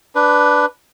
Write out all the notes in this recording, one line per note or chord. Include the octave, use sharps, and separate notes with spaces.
D4 B4